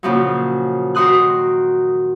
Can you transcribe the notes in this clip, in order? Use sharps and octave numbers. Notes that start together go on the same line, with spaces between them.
A#2 C#3 F3 F#3
D#3 F#4 C6 D#6 F#6